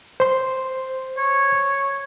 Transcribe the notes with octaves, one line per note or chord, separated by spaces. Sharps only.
C5 C6
C#5